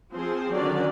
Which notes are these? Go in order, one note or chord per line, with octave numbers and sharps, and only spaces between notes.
F3 C4 G#4 C5
D3 D#3 F#3 C#4 D5